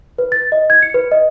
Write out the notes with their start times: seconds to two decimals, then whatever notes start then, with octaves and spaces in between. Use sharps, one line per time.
0.18 B4
0.32 A6
0.52 D#5
0.70 G#6
0.82 C#7
0.94 B4
1.12 D#5